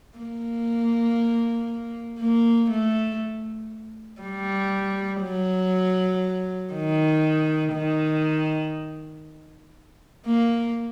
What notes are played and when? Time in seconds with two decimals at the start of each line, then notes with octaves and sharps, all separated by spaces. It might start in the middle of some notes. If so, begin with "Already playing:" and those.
0.18 A#3
2.20 A#3
2.71 A3
4.22 G3
5.22 F#3
6.73 D#3
7.74 D#3
10.26 A#3